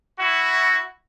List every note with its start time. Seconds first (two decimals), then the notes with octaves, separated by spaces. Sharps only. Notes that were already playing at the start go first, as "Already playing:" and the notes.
0.19 E4 F#4